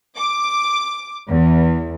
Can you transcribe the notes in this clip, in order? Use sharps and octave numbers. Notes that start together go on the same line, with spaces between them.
D6
E2